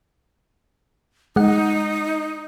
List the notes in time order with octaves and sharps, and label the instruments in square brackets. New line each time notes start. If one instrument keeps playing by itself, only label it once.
[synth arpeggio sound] G#3 F#5 [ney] D#4